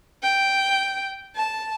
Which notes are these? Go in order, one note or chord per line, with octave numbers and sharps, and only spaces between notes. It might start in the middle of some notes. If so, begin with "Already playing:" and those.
G5
A5